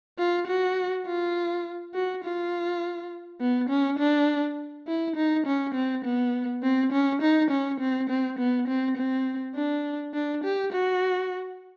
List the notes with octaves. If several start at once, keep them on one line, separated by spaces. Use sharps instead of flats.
F4
F#4
F4
F#4
F4
B3
C#4
D4
E4
D#4
C#4
C4
B3
C4
C#4
D#4
C#4
C4
C4
B3
C4
C4
D4
D4
G4
F#4